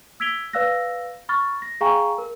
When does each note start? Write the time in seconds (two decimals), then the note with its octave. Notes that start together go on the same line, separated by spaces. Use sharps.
0.20 E6 G#6 B6 D7 F7 G7
0.53 B4 D5 F5 E6 F#6 A#6
1.29 B5 C#6 F6 A6
1.62 A#6
1.81 G#4 F5 G5 G#5 A#5 C#6
2.18 A#4